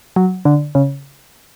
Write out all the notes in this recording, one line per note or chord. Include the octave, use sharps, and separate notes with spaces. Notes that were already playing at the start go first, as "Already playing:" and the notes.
F#3
D3
C#3